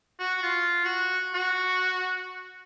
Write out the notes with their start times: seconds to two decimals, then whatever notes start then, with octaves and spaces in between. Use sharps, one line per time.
0.19 F#4
0.43 F4
0.85 F#4
1.34 F#4